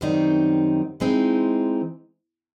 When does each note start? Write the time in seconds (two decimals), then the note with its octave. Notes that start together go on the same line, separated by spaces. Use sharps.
0.01 F#2 D#3 G3 C4 D#4
1.00 E3 G#3 C4 D#4